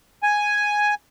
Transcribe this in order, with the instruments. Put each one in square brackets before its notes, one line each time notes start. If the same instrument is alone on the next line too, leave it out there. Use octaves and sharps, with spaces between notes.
[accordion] G#5